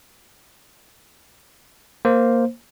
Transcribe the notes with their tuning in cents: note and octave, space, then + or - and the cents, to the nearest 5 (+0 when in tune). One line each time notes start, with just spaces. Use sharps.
A#3 +0 C5 +0